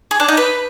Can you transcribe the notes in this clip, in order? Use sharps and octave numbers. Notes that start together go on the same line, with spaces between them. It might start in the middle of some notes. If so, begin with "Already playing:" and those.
G#4
D4
D#4
B4